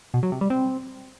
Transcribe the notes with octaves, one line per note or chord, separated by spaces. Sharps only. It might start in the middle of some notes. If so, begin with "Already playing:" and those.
B2
F#3
C3
G3
C4